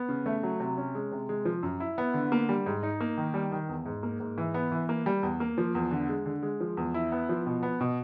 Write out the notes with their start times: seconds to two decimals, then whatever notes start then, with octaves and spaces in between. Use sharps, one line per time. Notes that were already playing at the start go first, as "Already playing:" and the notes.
Already playing: B3
0.09 C#3
0.26 A3
0.43 F#3
0.60 C3
0.78 C#4
0.95 G#3
1.12 C3
1.29 G#3
1.45 F3
1.63 F#2
1.80 E4
1.98 B3
2.14 D3
2.32 A#3
2.49 G3
2.66 G#2
2.83 D#4
3.00 A#3
3.17 D#3
3.34 G3
3.52 D#3
3.69 E2
3.86 G#2
4.03 A#3
4.20 G#2
4.38 E3
4.54 B3
4.72 E3
4.89 A#3
5.06 G3
5.23 E2
5.40 A#3
5.58 F3
5.75 E2
5.91 D3
6.09 G#3
6.26 D3
6.43 G#3
6.60 F3
6.77 E2
6.94 E4
7.12 B3
7.29 F3
7.46 B2
7.63 B3
7.80 B2